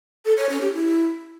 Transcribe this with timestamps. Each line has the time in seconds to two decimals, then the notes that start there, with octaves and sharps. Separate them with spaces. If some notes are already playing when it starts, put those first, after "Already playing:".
0.25 A4
0.37 C#5
0.49 C#4
0.61 G4
0.73 E4